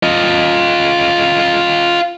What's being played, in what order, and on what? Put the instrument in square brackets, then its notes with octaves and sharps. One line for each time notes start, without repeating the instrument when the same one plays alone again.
[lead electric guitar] F4 D#5